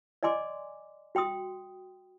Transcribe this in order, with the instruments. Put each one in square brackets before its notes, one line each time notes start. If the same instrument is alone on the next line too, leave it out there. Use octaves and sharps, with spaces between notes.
[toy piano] D5 D#5 G#5 C6 D6
F#4 G5 C6 D#6